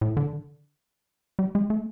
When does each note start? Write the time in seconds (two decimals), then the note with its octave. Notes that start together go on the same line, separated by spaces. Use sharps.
0.01 A2
0.17 D3
1.39 G3
1.55 G#3
1.70 A3